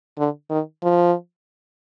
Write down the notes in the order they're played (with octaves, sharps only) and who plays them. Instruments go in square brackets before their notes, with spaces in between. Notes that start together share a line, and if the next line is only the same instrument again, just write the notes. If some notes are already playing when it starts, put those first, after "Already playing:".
[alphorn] D3
D#3
F3